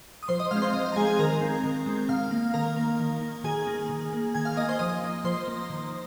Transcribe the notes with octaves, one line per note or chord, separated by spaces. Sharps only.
D#6
F3 C5 C6
D#5 D#6
G#3 C4 F5 F6
C5 C6
F3 D#5
F5
A#5
G#3 C4 G#4 G#5
G#4 G#5
D#3 A#4 A#5
G#3 C4
D#3
G#3 C4
D#3 F5 F6
A#3
D#3 A#4 A#5
A#3
D#3
A#3
D#3 G#4 G#5
A#3
D#3
A#3
D#3 G#5 G#6
F5 F6
A#3 D#5 D#6
C5 C6
F3 D#5 D#6
A#3
F3 C5 C6
A#3
D#3